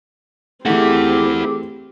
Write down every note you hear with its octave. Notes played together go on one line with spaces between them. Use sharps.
E3 A3 C4 E4 G4 G#4 F#5 D6